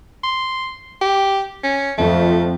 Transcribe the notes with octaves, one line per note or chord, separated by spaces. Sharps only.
C6
G4
C#4
F2 A3